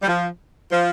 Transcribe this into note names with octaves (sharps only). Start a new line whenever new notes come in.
G3
F3
F3